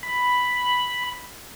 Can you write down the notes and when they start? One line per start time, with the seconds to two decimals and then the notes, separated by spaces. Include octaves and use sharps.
0.03 B5